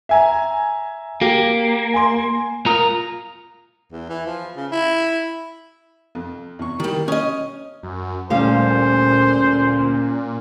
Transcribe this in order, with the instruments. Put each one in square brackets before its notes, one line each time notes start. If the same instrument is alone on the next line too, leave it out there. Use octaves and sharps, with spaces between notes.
[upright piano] E5 G#5 A#5
[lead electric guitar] A#3 [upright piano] G4
[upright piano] G#5 C6
[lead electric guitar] F4 A#5 [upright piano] A#4 D#6
[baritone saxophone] E2
E3
F3
C#3
E4
[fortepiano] F2
E2 C3 C#6
[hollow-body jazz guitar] D#3 G3 [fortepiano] E3 A#3 G4
[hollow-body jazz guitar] C#4 D#5 [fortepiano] D#6
[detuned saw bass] F#2
[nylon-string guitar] D2 G3 F5 [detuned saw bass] A#2 [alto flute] C#4 [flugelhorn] C5